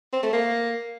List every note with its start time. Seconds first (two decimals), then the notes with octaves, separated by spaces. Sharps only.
0.13 C4
0.23 A3
0.33 A#3